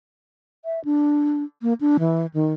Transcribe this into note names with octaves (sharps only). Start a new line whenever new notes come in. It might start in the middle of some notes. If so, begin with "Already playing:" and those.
E5
D4
A#3
D4
E3
D#3